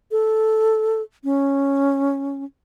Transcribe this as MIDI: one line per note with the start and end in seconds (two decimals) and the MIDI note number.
0.11 1.02 69
1.24 2.44 61